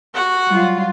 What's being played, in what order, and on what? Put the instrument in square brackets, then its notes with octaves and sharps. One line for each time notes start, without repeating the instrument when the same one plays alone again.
[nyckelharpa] F#4 F#5
[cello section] F#3 G3 F4